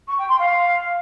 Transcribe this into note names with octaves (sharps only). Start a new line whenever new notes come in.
C#6
G5
C6
F5